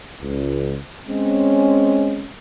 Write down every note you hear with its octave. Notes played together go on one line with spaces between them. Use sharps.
C#2
G#3 C4 C#4